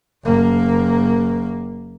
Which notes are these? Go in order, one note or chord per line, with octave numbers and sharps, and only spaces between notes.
F#1 A#3